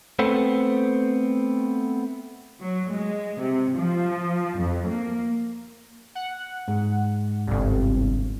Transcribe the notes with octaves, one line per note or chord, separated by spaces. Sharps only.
A3 B3 C4
F#3
G#3
C3
F3
F2
A#3
F#5
G#2
G1 C2